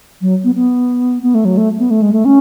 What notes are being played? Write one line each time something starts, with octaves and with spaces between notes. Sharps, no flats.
F#3
B3
B3
B3
A3
F#3
A3
B3
A3
G#3
A3
C#4